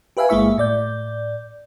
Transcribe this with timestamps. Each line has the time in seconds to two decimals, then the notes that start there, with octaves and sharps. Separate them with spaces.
0.17 G4 B4 E5 F5 G#5
0.29 G1 G#3 A#3 E4 E5 C#6
0.58 A2 D5 G6